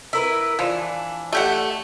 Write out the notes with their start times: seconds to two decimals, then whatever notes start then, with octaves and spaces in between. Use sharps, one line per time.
0.13 E4 A#4 B4
0.59 E3 F3 D4
1.33 A3 G4 F#5